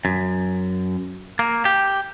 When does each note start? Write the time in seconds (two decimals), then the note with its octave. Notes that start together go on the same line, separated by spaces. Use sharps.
0.05 F#2
1.39 A#3
1.65 G4